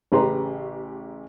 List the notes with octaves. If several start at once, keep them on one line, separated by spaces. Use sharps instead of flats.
A1 C#3 G4 B4 A#5 C6